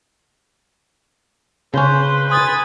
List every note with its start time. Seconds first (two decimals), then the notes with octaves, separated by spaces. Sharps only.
1.74 C#3 C#4 B4 C5
2.30 G#5 B5 C6 D#6 A6